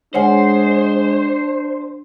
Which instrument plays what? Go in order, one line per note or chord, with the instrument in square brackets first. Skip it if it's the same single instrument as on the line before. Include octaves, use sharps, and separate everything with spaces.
[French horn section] G#3 [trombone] D4 [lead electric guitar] C5 [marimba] C#5 F#5 G#5